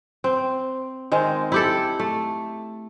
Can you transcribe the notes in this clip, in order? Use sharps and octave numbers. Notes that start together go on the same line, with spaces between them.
C4
D#3 G#3 C4
E4 G4 A4
A3